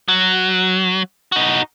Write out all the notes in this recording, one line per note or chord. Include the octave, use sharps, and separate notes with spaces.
F#3
D#4 F#4